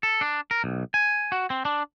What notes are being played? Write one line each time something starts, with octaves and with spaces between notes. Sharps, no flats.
A4
D4
A#4
B1
G#5
F#4
C4
D4